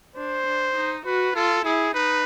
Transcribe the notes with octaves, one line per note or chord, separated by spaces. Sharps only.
D4 C5
D4
D#4
F#4 B4
F4 A4
E4 G#4
D#4 B4